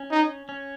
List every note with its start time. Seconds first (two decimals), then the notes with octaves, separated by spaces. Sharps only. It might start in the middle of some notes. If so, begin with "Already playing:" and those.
Already playing: C#4
0.11 D#4
0.49 C#4